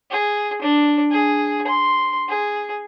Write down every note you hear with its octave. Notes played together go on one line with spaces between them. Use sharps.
G#4
D4
G#4
C6
G#4